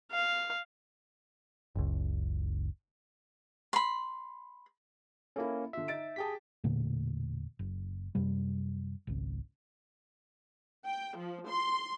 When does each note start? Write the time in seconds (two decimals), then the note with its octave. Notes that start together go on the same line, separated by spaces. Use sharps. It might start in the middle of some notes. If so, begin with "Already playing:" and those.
0.12 F5
1.75 F#1 C#2
3.73 B5 C6
5.36 A#3 C#4 E4 A4
5.73 D3 F4 E5
5.88 D#4 A6 D7
6.16 G4 G#4 G5 A5 B6
6.64 E1 A#2 D3 A3
7.59 F#1
8.15 F#2 C3 G3
9.07 G#1 C#2
10.86 G5
11.17 F3
11.48 C6